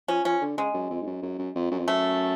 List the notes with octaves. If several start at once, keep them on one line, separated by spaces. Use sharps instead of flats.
F3 C#4
F3 C#4
D3
C#3 G#3
F#2
F2
G#2
F#2
F#2
F#2
F2
F#2
F2
F#2 A3